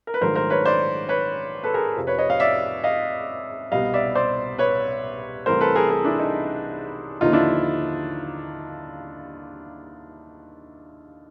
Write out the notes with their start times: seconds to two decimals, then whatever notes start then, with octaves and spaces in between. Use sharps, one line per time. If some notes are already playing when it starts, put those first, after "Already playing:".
0.07 A#4
0.14 B4
0.21 A#1 G#2 D#3 F#3 A3 A#4 C5
0.36 A#4 C5
0.50 B4 C#5
0.65 C5 D5
1.09 B4 C#5
1.64 A4 B4
1.74 G#4 A#4
1.96 F2 C3 F3
2.07 B4 C#5
2.18 C#5 D#5
2.30 D#5 F5
2.40 D5 E5
2.84 D#5 F5
3.72 C2 B2 G3 B3 D#5 F5
3.94 D5 E5
4.15 C5 D5
4.58 B4 C#5
5.46 C2 C3 E3 A3 A#4 C5
5.61 A4 B4
5.75 G#4 A#4
5.90 G#4 A#4
6.05 D4 E4
6.19 D#4
7.21 D#2 D3 F3 A#3 D#4 F4
7.33 D4 E4